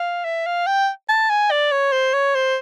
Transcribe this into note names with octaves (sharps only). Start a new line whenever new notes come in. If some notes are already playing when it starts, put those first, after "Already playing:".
Already playing: F5
E5
F5
G5
A5
G#5
D5
C#5
C5
C#5
C5